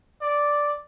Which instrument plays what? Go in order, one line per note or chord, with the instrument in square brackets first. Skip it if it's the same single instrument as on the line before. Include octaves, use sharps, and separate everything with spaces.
[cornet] D5